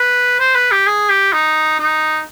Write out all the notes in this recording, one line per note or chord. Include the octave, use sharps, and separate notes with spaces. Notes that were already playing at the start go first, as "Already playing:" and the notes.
Already playing: B4
C5
B4
G4
G#4
G4
D#4
D#4